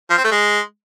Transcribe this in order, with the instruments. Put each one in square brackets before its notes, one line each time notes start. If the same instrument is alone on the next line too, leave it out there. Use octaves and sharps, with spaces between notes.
[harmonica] F3
C4
A3
G#3